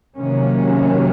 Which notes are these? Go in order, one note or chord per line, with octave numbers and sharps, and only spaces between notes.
C3 D#3 F#3 A#3 C#4